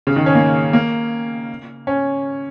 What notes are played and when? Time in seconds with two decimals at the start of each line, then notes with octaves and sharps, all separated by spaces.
0.07 C#3
0.16 D#3
0.26 C#4
0.35 A#3
0.73 A#3
1.87 C#4